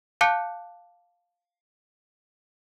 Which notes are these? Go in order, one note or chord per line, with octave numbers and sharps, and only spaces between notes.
F5 A5 D6 F#6 G6 C#7